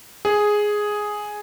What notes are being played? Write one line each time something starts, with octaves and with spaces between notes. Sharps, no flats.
G#4